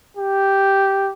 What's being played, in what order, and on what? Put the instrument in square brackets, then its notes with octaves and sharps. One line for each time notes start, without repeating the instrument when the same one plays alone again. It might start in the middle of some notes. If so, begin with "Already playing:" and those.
[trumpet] G4